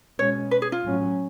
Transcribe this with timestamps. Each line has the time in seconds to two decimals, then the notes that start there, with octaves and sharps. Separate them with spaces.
0.19 B2 G#3 C#4 C#5
0.51 B4
0.62 G#4
0.72 F4
0.83 A2 F#3 C#4